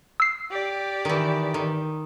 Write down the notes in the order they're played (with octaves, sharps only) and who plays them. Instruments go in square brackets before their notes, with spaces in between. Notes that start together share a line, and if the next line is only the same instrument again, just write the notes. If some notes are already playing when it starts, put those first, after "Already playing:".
[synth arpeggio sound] E6 C7
[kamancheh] G4 D5
[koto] D#3 E3
D#3